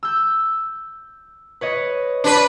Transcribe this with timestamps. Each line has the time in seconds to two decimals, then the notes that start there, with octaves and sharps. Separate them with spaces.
0.03 E6 G6
1.61 B4 C#5 D#5
2.24 D4 B4